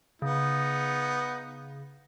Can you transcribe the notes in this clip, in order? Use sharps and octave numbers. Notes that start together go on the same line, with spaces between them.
C#3 B3 D#4